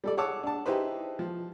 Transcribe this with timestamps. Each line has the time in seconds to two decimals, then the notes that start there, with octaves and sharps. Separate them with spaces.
0.04 G3 A4 D5
0.17 G#4 C#5 F#5 A5 D6 E6
0.43 D4 A5
0.66 D#4 E4 G4 G#4 B4 C5
1.19 F3